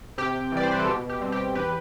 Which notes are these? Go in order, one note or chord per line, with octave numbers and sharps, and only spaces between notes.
C3 G4
E3 G3 D5
C5
B4
A4
B2 G4
G4
G3 C4
G4
E2 G4 B4